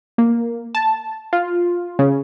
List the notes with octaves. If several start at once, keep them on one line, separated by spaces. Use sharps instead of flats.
A#3
A5
F4
C#3